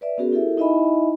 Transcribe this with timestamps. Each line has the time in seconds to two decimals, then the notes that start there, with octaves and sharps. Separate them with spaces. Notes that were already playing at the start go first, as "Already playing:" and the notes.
0.01 B4 D5 E5
0.18 B3 C#4 F#4 G#4 A#4
0.32 E4 G4 A4 A#4 E5
0.57 D#4 E4 D#5 E5 G#5 B5